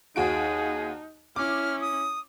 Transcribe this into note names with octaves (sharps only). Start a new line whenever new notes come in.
D#2 D#4 F#4 G#4 D7
C#4 E4 D6 F6
D#6